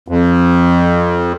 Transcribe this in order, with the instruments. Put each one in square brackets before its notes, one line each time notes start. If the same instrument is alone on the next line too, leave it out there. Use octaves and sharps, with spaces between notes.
[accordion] F2